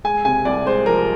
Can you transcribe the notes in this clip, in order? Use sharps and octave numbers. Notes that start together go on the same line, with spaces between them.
G#3 G#5
C3 G#5
C2 D5
G#3 C5
F3 A#4